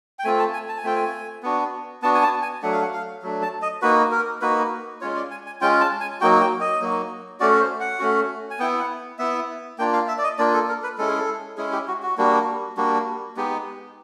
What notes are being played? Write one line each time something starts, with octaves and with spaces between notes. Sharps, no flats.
G5
A3 C4 F4 G#5
A5
G#5
A5
G#5
A3 C4 F4 G5
G#5
B3 D4 F#4
B3 D4 F#4 A5
G#5
A5
G#5
F#3 A3 D4 F#5
F5
F#5
F5
F#3 A3 D4
A5
D#5
A#3 D#4 F#4 B4
A#4
A#3 D#4 F#4 B4
G#3 C#4 F4 C#5
D5
G#5
G#5
G#3 C#4 F4 G5
A5
G#5
F#3 A#3 D#4 F#4 G5
G5
D#5
F#3 A#3 D#4 F#4
A3 C#4 F#4 D5
C5
F#5
A3 C#4 F#4
G#5
B3 E4 G5
F#5
B3 E4 E5
A#3 D4 F4 G5
F5
E5
D5
D#5
A#3 D4 F4 D5
A4
A#4
B4
G#3 C#4 E4 A4
G#4
A4
G#3 C#4 E4 G#4
G4
F#4
F#4
G3 A#3 D4 F#4
G3 A#3 D4 F#4
G#3 B3 D#4 G4